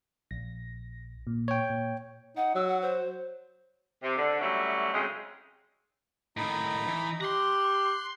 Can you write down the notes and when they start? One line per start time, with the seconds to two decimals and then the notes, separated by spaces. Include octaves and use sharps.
0.31 A#1 A#6
1.27 A#2
1.48 C#5 G5
1.70 A#2
2.37 D#4 F#5
2.55 F#3 E6
2.67 F#5
2.82 C5
4.02 C3
4.16 D3
4.41 F#3 G3 A3 C#4 E4
4.92 C#3 F#3 G#3 C4 D#4
6.37 A2 D#3 D#4 A#5 B5
6.88 E3
7.21 G4 A#5 C6 F#6